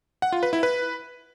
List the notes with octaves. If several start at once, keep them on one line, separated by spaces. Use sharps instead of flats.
F#5
F4
B4
E4
B4